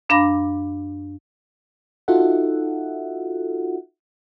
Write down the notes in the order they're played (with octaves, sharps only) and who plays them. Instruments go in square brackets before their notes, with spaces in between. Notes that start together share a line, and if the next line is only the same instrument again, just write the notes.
[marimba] F#2 D4 F5 B5 D6 A#6
[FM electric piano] D#4 F4 F#4 A4 E5 F#5